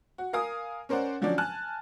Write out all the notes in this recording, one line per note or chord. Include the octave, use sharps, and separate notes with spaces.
F#4
A#4 F5 G#5 D#6
C#4 A#4 C5 D5 F#5
D3 F3 F#3 C#4 D4 D5
G#5 A5 F6 F#6